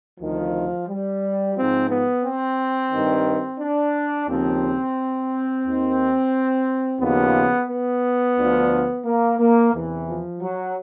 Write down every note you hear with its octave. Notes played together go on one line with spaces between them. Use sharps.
D2 C3 D#3 F3
G3
G#2 F3 C4
B3
C4
G2 D#3
D4
D#2 C#3 F3 C4
D#2 D#3
D#2 C#3 F3 B3
B3
D2 D3 F3
A#3
A#3
E2 C3 E3
F3
F#3